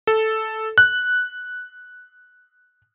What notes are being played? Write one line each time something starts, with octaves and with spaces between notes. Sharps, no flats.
A4
F#6